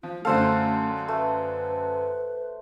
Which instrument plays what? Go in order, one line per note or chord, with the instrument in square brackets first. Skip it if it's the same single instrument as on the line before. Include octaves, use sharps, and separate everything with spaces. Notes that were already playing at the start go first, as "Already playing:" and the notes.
[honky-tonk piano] F3 [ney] F4
[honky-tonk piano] F#2 D3 F5 [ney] A3 [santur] A4 C5 F#5
[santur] A3 [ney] B4